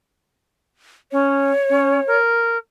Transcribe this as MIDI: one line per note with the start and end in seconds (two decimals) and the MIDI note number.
1.12 1.51 61
1.12 2.18 73
1.70 2.00 61
2.07 2.57 70